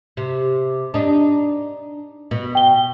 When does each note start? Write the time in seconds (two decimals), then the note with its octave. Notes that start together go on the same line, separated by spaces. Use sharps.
0.17 C3
0.94 D4 D#4
2.31 B2
2.55 G5 G7